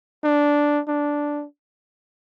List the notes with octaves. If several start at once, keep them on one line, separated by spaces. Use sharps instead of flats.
D4
D4